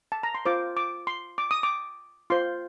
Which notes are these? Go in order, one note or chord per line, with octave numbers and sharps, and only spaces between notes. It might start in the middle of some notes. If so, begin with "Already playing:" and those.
A5
A#5
C6
F4 C5 D6
D6
C6
D6
D#6
D6
F4 C5 C6